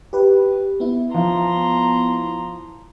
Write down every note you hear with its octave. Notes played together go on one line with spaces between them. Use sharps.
G4 B4
B3 E4
F3 A#5 C6